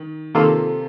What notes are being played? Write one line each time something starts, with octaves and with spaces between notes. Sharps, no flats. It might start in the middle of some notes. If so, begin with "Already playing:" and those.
Already playing: D#3
C3 D#3 A#3 F4 A4